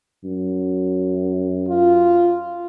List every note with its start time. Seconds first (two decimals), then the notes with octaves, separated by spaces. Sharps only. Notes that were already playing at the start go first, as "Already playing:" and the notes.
0.24 F#2
1.69 F4